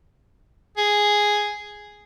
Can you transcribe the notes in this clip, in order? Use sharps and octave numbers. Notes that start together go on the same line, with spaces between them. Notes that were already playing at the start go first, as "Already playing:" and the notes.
G#4